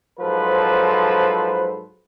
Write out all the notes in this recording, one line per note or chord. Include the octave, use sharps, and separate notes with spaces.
G#2 F3 F#3 A4 B4 C5